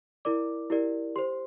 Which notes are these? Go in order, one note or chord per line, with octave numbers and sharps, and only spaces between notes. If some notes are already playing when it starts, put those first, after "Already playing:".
E4 A#4 D5 D6
E4 G4 A#4 D5
G4 C5 C6